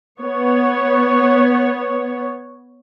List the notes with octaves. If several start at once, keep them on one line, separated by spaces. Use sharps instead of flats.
B3 C#5